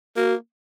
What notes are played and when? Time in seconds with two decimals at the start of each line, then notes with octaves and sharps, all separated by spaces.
0.16 A#3 F#4